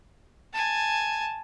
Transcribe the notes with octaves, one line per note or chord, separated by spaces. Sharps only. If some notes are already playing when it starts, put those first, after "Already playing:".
G#5 A5